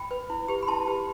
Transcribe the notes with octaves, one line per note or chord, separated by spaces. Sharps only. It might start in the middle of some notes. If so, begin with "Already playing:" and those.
Already playing: G5 B5
B4
E4
G4 B4
B5
E4 A5 C6
G4 B4